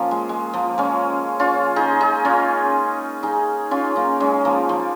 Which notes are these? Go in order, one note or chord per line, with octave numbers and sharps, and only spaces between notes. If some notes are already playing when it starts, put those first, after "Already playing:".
Already playing: F3 A#3 C#4
G#3
G#3
F3 A#3
G#3 C#4
C#4 F4
D#4 G#4
D#4 G#4
C#4 F4
D#4 G#4
C#4 F4
A#3 D#4
G#3 C#4
F3 A#3
F3